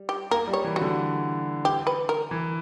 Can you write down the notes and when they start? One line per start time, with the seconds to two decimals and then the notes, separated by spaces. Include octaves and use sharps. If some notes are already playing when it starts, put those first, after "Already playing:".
Already playing: G3
0.09 G4
0.31 A#3 A#4
0.48 G3
0.53 C#5
0.64 E3
0.76 F#4
0.82 D3
1.65 G4
1.87 B4
2.09 A#4
2.31 E3